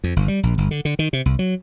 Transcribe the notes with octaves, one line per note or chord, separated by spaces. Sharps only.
F2
G1
G3
A#1
G1
D3
D3
D#3
C3
C2
F#3